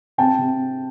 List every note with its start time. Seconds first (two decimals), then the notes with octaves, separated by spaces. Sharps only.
0.18 C3 G5 A5
0.38 C3